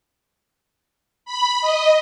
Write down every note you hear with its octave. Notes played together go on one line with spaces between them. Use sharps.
B5
D#5